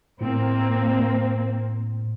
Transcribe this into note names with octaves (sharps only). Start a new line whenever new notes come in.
A2 A#3 C4